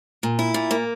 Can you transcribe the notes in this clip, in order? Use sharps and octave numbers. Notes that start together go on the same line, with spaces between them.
A#2
E4
A#2
A#3